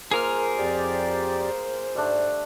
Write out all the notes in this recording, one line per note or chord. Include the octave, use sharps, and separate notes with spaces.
A#3 F4 G#4 A#4 C5 F6
F2 G4 D5
G#2 G3 A3 D4